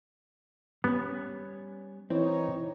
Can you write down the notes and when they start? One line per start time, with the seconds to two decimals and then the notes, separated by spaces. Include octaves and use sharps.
0.84 G3 B3 C#4
2.10 E3 C4 D#4 C#5